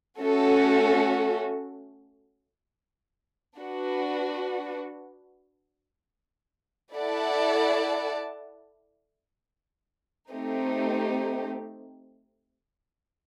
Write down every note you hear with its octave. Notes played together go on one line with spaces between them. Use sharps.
A3 C#4 F#4 A4
D4 F#4 B4
E4 A4 D5 F#5 A5
A3 C4 D#4 G4